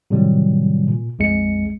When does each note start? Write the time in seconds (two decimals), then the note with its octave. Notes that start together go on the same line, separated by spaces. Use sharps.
0.10 A2 C3 D#3 F#3 G3
0.88 A#2
1.19 A#1 F2 G#3 C#7